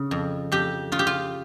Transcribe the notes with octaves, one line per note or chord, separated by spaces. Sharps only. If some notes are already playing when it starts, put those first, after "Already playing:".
Already playing: C#3
F2
F2 G4
C#3 F4
G4
F4